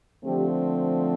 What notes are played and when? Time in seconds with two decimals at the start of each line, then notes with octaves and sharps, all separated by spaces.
0.24 D3 F3 A3 C4 G4